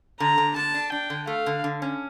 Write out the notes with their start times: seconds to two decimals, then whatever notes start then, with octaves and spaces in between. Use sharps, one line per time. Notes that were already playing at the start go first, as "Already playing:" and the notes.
0.20 D3 A#5
0.38 D3
0.56 D3 A5
0.74 D4
0.92 D4 G5
1.10 D3
1.27 A3 F5
1.46 D3
1.64 D3
1.82 C#4